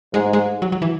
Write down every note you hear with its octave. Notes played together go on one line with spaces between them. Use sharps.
G#2 G#3
G#3
F#3
F#3
E3